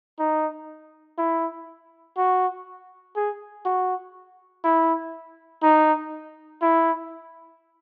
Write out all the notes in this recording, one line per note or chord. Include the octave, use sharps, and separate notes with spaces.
D#4
E4
F#4
G#4
F#4
E4
D#4
E4